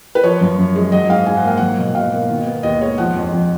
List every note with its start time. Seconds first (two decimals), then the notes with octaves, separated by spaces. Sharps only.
0.15 B4
0.24 F3 C#5
0.41 F#2
0.58 F#2
0.76 G#3
0.92 F#3 D#5
1.09 G#2 F5
1.26 G#2 G#5
1.36 F#5
1.43 A#3 F5
1.57 F#3 F#5
1.78 B2
1.95 B2 F5
2.12 A#3
2.30 D#3
2.47 B3
2.63 D#2 D#5
2.81 G#3 C#5
2.98 F3 F#5
3.15 F2
3.32 F2